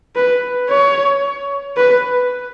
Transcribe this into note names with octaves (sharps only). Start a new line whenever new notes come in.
B4
C#5
B4